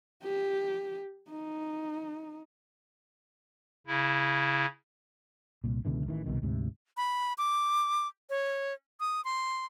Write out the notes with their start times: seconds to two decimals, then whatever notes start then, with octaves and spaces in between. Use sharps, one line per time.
0.23 G4
1.30 D#4
3.87 C#3 E4
5.64 C2 A#2
5.85 C#2 B2 D3 E3
6.07 A1 D#3 E3
6.26 C2 B2 D#3
6.42 D2 G#2 C3
6.97 B5
7.38 D6
8.30 C#5
9.00 D#6
9.25 C6